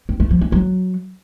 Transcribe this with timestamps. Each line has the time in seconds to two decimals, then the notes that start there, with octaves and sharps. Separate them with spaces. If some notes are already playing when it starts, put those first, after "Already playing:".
0.09 C4
0.20 A3
0.31 F3
0.41 C#4
0.52 F#3